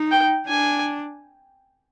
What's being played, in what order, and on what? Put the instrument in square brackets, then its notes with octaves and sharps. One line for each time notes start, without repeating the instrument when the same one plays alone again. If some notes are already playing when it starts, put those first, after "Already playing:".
Already playing: [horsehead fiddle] D#4
[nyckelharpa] G5
[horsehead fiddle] D4 [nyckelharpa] G#5